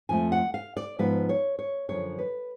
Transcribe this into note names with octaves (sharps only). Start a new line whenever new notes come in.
F2 F3 A3 G#5
F#5
F5
D5
G#2 F3 B3 B4
C#5
C#5
F#2 D3 F3 C#5
B4